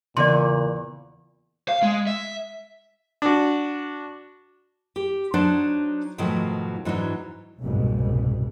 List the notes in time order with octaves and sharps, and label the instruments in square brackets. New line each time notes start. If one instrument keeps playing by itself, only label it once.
[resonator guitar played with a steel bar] E2 [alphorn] A#2 [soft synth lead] C#3 [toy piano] D5 C6
[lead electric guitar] F5
G#3
E5
[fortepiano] D4 F#4
[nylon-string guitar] G4
F#3 D4 D#4 C5 D5 A5
G#2 B2 D#3 F3 F#3 A3
G#2 E3 F#3 B3 D4 D#4
[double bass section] F#1 C2 G#2 B2